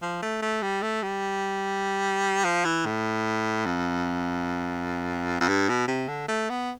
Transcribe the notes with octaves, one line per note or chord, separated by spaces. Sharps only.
F3
A3
A3
G3
A3
G3
F3
E3
A2
F2
F2
G2
B2
C3
D3
A3
B3